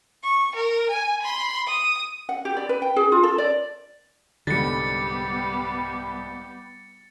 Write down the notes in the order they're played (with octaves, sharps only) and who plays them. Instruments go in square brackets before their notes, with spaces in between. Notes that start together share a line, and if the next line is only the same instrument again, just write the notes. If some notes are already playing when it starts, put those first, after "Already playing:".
[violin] C#6
A#4
G#5
B5 C6
D#6
[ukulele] F#5
G4
D5
B4
G5
G#4
F4
A4
D5
[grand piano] C2 G#2 [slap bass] D3 [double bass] G3 B3 [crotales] A6 C#7